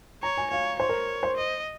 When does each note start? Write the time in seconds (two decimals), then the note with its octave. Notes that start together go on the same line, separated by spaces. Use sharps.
0.23 C#5 A#5
0.37 G#5
0.51 C#5 F5
0.79 C5 C#5
0.89 A#4
1.23 C5
1.37 D#5